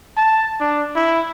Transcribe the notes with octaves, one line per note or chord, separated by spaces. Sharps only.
A5
D4
E4